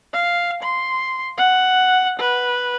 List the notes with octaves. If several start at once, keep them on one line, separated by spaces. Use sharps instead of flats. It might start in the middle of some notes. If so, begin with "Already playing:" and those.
F5
C6
F#5
B4